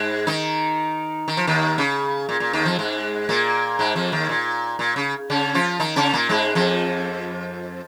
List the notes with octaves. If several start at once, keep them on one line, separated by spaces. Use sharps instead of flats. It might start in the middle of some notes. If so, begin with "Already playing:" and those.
Already playing: G#2 G#3
D#3 D#4
D#3
F3
D#2 D#3
C#3
A#2
A#2
D#2 D#3
F2 F3
G#2 G#3
A#2 A#3
G#2 G#3
F2 F3
D#2 D#3
A#2
A#2
C#3
C#3 C#4
F3 F4
D#3 D#4
C#3 C#4
A#2 A#3
G#2 G#3
F2 F3